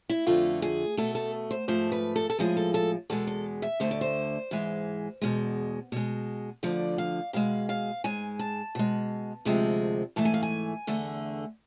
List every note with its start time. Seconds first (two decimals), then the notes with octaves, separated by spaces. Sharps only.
0.09 E4
0.27 F2 D3 A3 F4
0.62 G#4
0.97 B2 A3 A4
1.15 A4
1.51 C5
1.68 G#2 F3 A3 C5
1.92 B4
2.16 A4
2.30 A4
2.39 A2 F3 G#3 G#4
2.57 A4
2.74 A4
3.10 E2 B2 G#3 A4
3.27 A4
3.62 E5
3.80 D2 D3 A3 C5
3.91 D5
4.01 C5
4.51 G#2 E3 G#3
5.21 E2 B2 G#3
5.92 B2 G#3
6.63 D2 D3 F3 D5
6.98 F5
7.33 B2 G#3 F5
7.69 F5
8.04 G#2 G#3 G#5
8.39 A5
8.75 B2 G#3
9.45 D2 C3 F3 G#3
10.16 G#2 E3 A3 A5
10.25 G#5
10.34 F5
10.43 G#5
10.87 E2 D3 A3